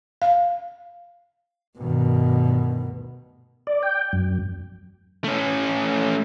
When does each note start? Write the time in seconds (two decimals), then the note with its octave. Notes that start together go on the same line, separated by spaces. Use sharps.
0.22 F5
1.78 D2 G2 B2 D#3
3.67 D5
3.83 G5
4.13 F#2
5.24 A3 C#4